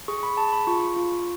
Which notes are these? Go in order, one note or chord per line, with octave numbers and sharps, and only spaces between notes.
G#4 C#6
B5
G#4 A5
B5
F4 C#6
F4